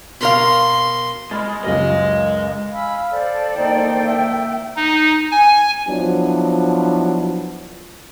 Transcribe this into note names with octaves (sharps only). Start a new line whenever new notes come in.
B2 A#4 F5 C6
G#3 B5 F6 A6
C#2 F#2 G#3 G4 D#5
F5 G#5 B5 E6
A4 C5 D5
A#3 D#4 G5
E5
D#4
G#5
F3 F#3 B3 D4 E4